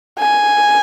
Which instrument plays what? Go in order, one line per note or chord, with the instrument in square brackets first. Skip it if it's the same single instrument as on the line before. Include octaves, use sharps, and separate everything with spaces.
[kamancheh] G#5